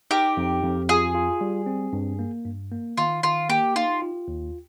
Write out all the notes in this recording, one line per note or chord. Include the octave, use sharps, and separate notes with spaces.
D#4 G4 A#4
F2
F2
F4 G#4
F4
G3
C4
G2
A#3
G2
A#3
D#3 F4
D#3 F4
A#3 G4
D#4 F4
F4
D#2